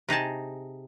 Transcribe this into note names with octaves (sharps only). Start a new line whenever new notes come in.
C3 D#4 G#4 A5